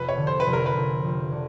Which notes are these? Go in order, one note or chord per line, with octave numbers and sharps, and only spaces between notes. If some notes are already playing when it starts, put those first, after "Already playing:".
Already playing: F1 B4
C#5
D3
C5
B4
F1
A#4
B4
F1
F1
D3